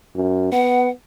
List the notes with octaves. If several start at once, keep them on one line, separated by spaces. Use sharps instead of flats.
F#2
B3 F#5